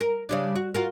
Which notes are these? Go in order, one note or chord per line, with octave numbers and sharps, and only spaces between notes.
A#4
C#3 G3 D4
F#4
F4 F#4 A#4